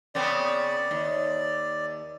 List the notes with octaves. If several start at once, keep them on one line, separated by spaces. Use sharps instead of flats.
C#3 B3 C4 D5
D#2